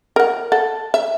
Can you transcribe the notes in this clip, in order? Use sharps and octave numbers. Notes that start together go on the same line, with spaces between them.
A#4 F#5
A4 F#5
E5